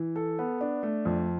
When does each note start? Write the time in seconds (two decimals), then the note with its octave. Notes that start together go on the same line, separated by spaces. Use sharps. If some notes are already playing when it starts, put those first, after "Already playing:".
Already playing: E3
0.16 A4
0.39 B3
0.61 D4
0.83 A3
1.05 F2